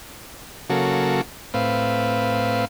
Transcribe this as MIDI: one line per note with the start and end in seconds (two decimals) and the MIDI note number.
0.70 1.21 49
0.70 1.21 54
0.70 1.21 58
0.70 1.21 66
0.70 1.21 69
1.54 2.65 45
1.54 2.65 60
1.54 2.65 71
1.54 2.65 77